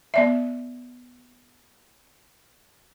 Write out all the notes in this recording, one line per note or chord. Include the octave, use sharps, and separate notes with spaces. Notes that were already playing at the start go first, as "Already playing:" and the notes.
B3 D5 E5